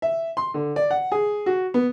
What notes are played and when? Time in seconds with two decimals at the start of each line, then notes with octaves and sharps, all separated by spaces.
0.02 E5
0.37 C6
0.54 D3
0.76 D5
0.91 F#5
1.12 G#4
1.46 F#4
1.74 B3